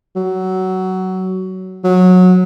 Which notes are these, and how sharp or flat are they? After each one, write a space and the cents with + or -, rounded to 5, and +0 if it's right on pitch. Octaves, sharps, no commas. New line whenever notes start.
F#3 +15
F#3 -20